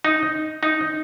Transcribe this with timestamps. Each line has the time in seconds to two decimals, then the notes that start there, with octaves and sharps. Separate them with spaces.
0.05 D#4
0.63 D#4